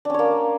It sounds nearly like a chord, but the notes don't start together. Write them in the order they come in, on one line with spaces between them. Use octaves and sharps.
D4 C#4 C#5 A#3